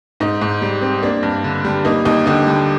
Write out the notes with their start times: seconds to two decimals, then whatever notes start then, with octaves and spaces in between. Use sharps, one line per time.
0.20 G#2 D#4
0.41 G#2
0.62 G3
0.82 C4
1.03 A#3 D4
1.23 G2
1.44 D3
1.65 G3
1.85 A#3 D#4
2.05 D#2 D#4
2.26 D3 D#4 G4
2.47 G3